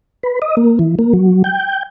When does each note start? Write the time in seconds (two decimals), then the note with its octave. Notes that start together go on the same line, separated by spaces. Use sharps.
0.23 B4
0.42 D#5
0.57 A#3
0.79 E3
0.99 A#3
1.13 F#3
1.44 G5